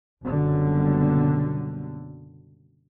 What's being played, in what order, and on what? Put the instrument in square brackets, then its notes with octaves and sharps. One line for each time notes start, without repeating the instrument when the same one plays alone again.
[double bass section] F#1 B2 D3 G3